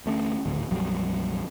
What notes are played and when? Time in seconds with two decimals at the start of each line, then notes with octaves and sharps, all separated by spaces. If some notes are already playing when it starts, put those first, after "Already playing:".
0.06 D2 A3 B3 C#4
0.46 D1 G#1 D2
0.70 A#1 F2 F#3 G3